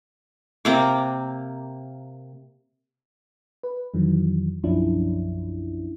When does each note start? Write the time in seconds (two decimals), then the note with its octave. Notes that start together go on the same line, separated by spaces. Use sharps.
0.65 C3 A#3 D6
3.63 B4
3.94 F2 D#3 E3 F#3
4.63 B1 F#2 F3 C#4 D4 E4